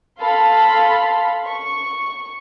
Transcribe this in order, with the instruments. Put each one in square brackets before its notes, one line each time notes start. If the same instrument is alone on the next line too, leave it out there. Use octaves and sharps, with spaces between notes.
[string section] A4 F5 B5 C6
C#6